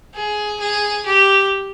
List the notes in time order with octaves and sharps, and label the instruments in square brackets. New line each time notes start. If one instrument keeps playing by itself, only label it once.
[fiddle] G#4
G#4
G4